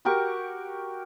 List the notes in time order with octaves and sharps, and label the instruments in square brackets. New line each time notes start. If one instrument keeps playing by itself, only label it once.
[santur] F#4 G4 A#4 C#6